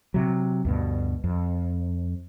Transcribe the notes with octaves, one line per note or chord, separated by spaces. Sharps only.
C3 F#3
D2 G2 B2
F2